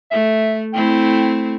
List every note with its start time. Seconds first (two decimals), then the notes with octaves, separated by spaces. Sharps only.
0.11 A3 E5
0.73 A3 C4 E4 G5